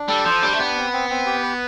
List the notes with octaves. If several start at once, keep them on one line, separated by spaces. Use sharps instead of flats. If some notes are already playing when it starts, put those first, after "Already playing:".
Already playing: D4
G3 A4
F3 C5
G3 D4
A3
B3 G4
C4
C4
C4
G4
B4